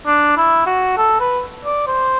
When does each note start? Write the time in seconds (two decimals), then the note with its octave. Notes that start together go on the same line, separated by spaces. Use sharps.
0.06 D4
0.37 E4
0.66 F#4
0.97 A4
1.20 B4
1.64 D5
1.87 C5